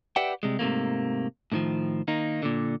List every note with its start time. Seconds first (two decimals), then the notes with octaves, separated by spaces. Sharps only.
0.16 G4 B4 D5 E5 F#5 G5
0.43 C3 G3 G#3
0.59 G#2 C3 D#3 A3 A#3
1.52 A2 D3 D#3 F3
2.08 D#3 A#3 D#4
2.43 A#2 D3